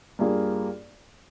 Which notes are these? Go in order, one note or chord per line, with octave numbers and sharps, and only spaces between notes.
G2 G3 A#3 F4 G#4